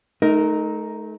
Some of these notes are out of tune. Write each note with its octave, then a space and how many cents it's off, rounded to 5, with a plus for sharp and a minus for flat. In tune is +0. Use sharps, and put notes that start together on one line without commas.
A3 -35 D#4 +0 A#4 +0